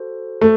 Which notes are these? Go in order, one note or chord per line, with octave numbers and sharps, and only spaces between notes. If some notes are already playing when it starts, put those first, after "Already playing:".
Already playing: F#4 A4 C5
A3